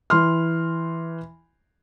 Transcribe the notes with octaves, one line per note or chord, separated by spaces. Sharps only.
E3 C6 F6